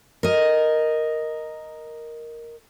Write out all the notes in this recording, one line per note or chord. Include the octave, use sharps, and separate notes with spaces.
A#4 D#5